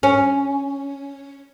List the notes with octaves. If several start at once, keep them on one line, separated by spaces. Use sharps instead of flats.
C#4